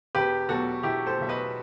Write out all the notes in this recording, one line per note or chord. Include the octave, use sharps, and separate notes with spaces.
E1 G4 B4
E2 B2 F#3 F#4 A4
E1 E4 G4
A4 C5
E2 B2 F#3 E5
B4 D#5